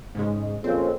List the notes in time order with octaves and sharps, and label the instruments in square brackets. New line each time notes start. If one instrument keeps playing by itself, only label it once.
[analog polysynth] G#2 C#3 G#3
[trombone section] F2 A#2 C#3 [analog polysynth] C4